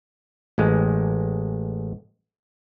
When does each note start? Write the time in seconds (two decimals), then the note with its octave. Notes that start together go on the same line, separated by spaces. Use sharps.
0.58 A1 G#3